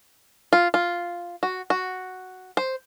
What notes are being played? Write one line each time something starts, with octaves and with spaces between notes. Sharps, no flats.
F4
F4
F#4
F#4
C5